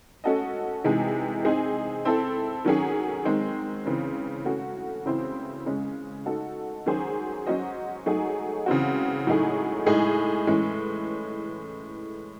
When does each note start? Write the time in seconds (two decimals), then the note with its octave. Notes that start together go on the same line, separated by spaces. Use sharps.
0.24 A3 C#4 F#4 A4 D#5
0.84 C3 E3 G#3 D#4 G#4
1.45 C4 D#4 G#4 D#5
2.05 C4 E4 A4
2.65 D#3 F#3 C#4 G#4
3.25 D#3 G#3 C4
3.86 C#3 E3 C4
4.45 A3 C#4 F#4
5.06 C#3 E3 C4 E4 C5
5.66 C#3 G#3 C#4
6.26 A3 D#4 F#4 A4
6.86 D#3 F#3 C#4 G#4 C5
7.47 F#3 C#4 F#4 C5 D#5
8.06 F#3 A3 D#4 G#4
8.66 C#3 E3 C4 F#4
9.27 A2 F#3 A3 D#4 G#4
9.86 A2 G#3 D#4 G#4 D#5
10.47 A2 E3 G#3 C#4